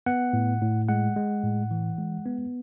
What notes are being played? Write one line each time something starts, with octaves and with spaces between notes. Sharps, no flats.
B3 F#5
A2
A2
G#3 F#5
G#3
A2
E3
G#3
B3